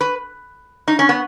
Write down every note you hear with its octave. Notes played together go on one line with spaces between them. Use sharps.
B4
D#4
C#4
B3